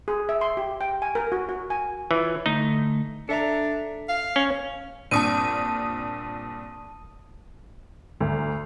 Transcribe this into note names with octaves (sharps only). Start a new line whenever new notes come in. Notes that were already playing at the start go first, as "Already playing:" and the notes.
G#4
E5
C6
G4
G5
G#5
A#4
F#4
F#4
G#5
E3 F4 C#5
D3 A3 D#4
D4 A4 E5 A#5
F5
C#4
G2 A#2 C4 A5 D#6 D#7
D2